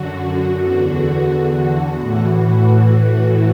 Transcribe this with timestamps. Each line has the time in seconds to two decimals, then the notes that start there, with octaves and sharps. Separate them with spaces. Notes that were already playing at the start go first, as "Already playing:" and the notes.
Already playing: F#2 D3 F#4
0.60 E2 D3 F#4
2.00 A2 E3
2.69 F#4